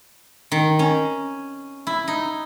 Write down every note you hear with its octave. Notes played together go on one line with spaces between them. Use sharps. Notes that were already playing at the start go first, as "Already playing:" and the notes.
D#3
C#4
E4
D#4